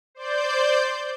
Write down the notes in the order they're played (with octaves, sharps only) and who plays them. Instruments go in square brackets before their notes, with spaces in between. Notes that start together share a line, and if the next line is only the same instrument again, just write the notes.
[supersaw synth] C5 D5 G6